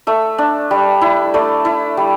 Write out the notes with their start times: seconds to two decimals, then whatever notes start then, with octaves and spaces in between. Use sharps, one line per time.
0.07 A3 E5
0.38 D4
0.71 G3
1.01 E4
1.34 A3 D5
1.65 E4
1.97 G3